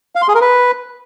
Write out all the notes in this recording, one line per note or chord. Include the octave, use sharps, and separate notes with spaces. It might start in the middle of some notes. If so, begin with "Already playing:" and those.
F5
C6
G#4
A#4
B4